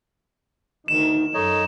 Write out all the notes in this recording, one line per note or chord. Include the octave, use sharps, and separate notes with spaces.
D2 D#3 D#4 E7
F#2 D#4 A4 C#5 D#5